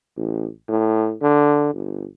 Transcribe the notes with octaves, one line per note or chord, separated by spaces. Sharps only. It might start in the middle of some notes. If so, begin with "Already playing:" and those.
A1
A2
D3
G1